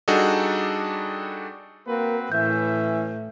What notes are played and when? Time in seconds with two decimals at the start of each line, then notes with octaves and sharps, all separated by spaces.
0.08 G3 D4 D#4 F#4 G#4 A4
1.87 A#3 C4 F#4 B4
2.32 A2 E3 C#4 E5 G6